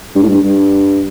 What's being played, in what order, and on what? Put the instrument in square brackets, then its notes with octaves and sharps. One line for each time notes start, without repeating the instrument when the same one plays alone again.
[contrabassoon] G2
A2
G2
G2